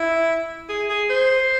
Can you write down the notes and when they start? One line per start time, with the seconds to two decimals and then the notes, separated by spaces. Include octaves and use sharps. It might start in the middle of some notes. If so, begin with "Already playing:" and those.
Already playing: E4
0.69 G#4
0.89 G#4
1.09 C5